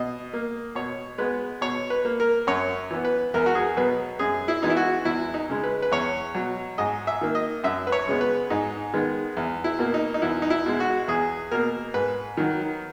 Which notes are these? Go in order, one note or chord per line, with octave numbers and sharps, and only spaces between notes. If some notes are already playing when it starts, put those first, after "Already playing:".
Already playing: B2 D#5
A#3
B2 C#5
G#3 B3 B4
B2 C#5
B4
A#3
A#4
F#2 C#5
E3 B3
B4
E2 A#4
F#4
G#4
B2 F#3 B3 B4
F#2 G#4
E4
E3 G#3 B3 D#4
E4
F#4
E2 E4
D#4
C#3 G#3
B4
B4
E2 C#5
B2 F#3
G#2 D#5
E5
D#3 A#3
D#5
F#2 E5
B4
C#5
C#3 G#3 B3
B4
G#2 D#4
D#3 G#3 B3
E2
E4
B2 A#3
D#4
D#4
E2 E4
D#4
E4
B2 G#3
F#4
E2 G#4
B2 A#3 A#4
G#2 B4
D#3 F#3